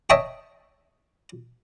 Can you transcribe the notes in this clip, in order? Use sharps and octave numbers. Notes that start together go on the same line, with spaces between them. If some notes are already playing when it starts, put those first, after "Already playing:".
C#5 D#5 E5 G5 A5 C#6